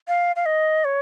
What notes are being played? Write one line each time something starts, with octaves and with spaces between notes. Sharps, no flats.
F5
F5
D#5
C#5